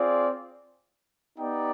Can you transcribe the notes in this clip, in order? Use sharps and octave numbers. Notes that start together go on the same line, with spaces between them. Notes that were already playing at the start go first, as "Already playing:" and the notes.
Already playing: C4 F4 G#4 D5
B3 D#4 G4 D5 G5